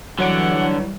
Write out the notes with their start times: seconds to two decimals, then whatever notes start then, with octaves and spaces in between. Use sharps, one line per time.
0.19 D3 E3 F#3 G3 C#5 F#5 D7